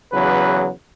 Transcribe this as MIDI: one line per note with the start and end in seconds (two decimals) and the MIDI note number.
0.13 0.69 40
0.13 0.69 49
0.13 0.69 54
0.13 0.69 71